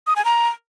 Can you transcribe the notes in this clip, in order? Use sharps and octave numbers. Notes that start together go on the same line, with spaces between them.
D#6
G#5
A#5